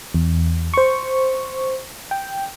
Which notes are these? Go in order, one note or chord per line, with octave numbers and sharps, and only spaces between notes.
E2
C5 C#6
G5